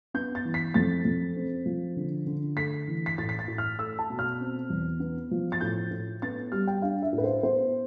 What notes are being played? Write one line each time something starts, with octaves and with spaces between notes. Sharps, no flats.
B3 G6
A6
E3
B6
F2 A6
F2
C4
F3
D3
D3
A3 B6
E3
B6
A2 A6
B6
A6
A2
F6
A3 E6
A5
B2
F6
C4
E2
B3
F3
A6
A2 G6
A2
B3 A6
G3 F6
G5
D4 F5
E5
A2
B4
C5
B3 C5